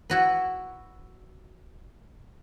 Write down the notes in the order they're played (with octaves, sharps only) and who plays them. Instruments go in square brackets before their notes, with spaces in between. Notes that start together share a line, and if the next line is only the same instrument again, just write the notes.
[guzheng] E4 F#4 B4